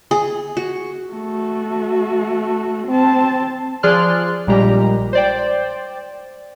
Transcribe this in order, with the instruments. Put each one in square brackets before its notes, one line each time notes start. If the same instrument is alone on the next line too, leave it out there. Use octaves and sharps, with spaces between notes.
[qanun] G#4
F#4
[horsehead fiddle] A3 F#4
C4 A5
[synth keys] F3 G#4 D5 C6 F6 F#6
A#1 A#2 G3 G#3 G4 A#5
C5 D5 G5